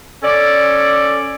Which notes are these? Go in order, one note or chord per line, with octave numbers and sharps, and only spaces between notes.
C#4 A4 D5